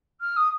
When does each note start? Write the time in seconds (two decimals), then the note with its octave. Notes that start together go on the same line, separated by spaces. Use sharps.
0.20 F6
0.36 D#6